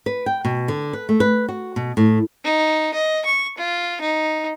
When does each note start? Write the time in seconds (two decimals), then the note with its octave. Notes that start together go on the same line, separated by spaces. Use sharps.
0.06 B4
0.26 G5
0.45 B2
0.68 D3
0.93 B4
1.09 A3
1.20 B4
1.48 F#4
1.76 B2
1.97 A2
2.44 D#4
2.94 D#5
3.25 C#6
3.58 F4
4.01 D#4